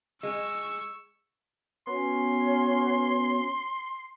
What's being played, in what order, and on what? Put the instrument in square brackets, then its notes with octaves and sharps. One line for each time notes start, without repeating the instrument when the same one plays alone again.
[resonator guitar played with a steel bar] G#3 [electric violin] C#6 E6
[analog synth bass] B3 [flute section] C#4 F#4 C#5 [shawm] C6